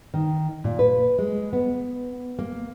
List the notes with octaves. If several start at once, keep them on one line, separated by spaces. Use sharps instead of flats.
D#3
A#2
B4
G#3
B3
A#3